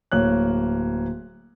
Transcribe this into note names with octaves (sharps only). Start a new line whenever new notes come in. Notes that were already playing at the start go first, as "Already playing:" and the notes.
D1 A#3 C#5 F#6